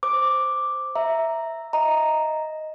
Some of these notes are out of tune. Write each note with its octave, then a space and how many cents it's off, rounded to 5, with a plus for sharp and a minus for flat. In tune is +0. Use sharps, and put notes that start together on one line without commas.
C5 +0 D6 +0
E5 +0 A#5 +0
D#5 +0 A#5 +0